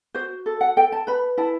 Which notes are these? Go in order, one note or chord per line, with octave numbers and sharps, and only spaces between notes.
F#4 C5
A4
F#5
A4 G5
A5
B4 B5
E4 A5